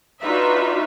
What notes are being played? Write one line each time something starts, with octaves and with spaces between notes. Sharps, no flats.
D4 D#4 F4 F#4 B4 E5